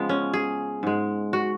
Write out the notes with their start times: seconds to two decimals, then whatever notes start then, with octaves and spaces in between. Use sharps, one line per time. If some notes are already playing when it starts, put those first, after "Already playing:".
Already playing: C#3 F3 G#3 B3
0.09 C#4
0.33 G#4
0.83 G#2 G#3
1.33 F#4